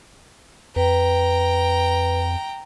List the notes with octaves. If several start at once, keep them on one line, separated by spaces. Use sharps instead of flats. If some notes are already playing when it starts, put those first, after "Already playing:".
F2 B4 G5 A#5